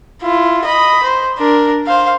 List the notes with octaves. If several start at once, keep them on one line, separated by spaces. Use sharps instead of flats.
E4 F4
D#5 B5
C5
D4 A#4
C5 F5